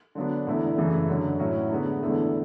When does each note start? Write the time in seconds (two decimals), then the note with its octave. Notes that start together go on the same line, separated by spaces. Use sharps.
0.15 D3 F#3 B3 D4
0.47 E2 D3 A3 E4
0.77 F#2 C#3 E3 A3
1.09 F#2 D3 F#3
1.39 A2 F#3 C#4 E4
1.71 D3 G#3 B3
2.01 E2 D3 A3 E4